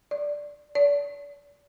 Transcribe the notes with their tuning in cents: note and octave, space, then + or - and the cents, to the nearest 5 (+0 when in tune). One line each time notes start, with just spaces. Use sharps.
D5 +0
D5 -35